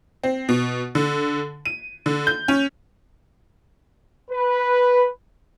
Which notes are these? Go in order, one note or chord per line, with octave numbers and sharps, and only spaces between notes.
C4
B2
D3
D#7
D3
G6
C#4
B4